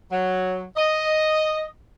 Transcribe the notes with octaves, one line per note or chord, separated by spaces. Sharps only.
F#3
D#5